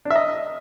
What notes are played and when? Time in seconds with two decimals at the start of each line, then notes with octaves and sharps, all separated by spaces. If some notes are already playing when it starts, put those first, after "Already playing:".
0.05 D4
0.10 E5
0.16 D#5